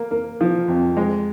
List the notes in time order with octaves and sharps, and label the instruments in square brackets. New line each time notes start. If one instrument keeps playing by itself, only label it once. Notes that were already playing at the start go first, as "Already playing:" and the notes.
Already playing: [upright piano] A#3
A#3
F3
F2
G#3